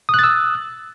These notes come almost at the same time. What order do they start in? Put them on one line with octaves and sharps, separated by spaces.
D#6 F#6 A6 E6